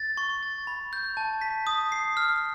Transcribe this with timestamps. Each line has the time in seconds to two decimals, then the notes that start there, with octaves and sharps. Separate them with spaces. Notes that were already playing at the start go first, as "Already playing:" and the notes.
Already playing: A6
0.17 C#6
0.43 A6
0.67 B5
0.93 G6
1.17 A5
1.41 B6
1.67 D#6
1.92 C7
2.17 F6